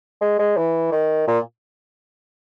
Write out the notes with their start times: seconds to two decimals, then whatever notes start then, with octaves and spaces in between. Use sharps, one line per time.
0.21 G#3
0.39 G#3
0.57 E3
0.92 D#3
1.28 A#2